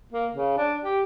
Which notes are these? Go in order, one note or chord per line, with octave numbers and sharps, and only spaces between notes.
A#3
C#3
D4
G4